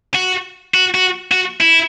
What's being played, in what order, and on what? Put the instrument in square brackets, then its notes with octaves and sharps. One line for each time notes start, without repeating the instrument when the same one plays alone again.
[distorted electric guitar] F#4
F#4
F#4
F#4
E4